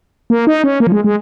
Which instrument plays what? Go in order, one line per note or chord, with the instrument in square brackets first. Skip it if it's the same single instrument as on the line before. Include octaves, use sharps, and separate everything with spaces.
[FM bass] A#3
D#4
C#4
A#3
F3
G#3
G#3